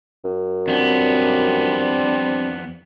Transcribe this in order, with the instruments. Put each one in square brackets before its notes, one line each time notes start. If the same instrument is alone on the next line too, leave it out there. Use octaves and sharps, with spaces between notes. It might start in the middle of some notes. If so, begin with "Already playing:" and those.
[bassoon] F#2
[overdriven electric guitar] F2 B3 [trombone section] G3 C4 D4